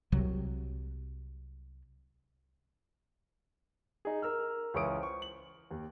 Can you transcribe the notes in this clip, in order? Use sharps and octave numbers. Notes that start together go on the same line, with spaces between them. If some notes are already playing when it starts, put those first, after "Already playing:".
C2 C3 F#3
D#4 G#4
A#4 E6 F6
C#2 E3 C#5 C#6 D#6 D7
C5 C#6
F#7
D#2